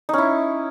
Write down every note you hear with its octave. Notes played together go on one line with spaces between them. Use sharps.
C#4 D#4 E4